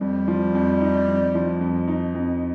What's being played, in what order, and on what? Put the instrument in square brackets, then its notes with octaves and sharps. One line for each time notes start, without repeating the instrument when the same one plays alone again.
[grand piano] F2 [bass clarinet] G3
[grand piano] F3
F2
D#4
F2
F3
F2
D#4
F2